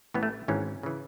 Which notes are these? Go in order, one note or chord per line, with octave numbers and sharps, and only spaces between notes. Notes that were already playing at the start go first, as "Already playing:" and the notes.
A1 A2 E3 B3
A3
G#1 G#2 E3 C#4
C#3 E3